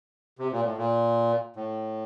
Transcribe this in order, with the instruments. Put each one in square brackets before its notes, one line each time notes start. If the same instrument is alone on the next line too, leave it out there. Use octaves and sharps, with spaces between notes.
[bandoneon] C3
A#2
A2
A#2
A2